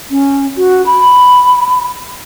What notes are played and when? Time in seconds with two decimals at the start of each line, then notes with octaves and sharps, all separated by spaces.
0.10 C#4
0.57 F#4
0.86 B5